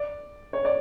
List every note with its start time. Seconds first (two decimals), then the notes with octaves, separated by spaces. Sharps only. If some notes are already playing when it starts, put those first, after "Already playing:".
Already playing: D5
0.53 C#5
0.65 D5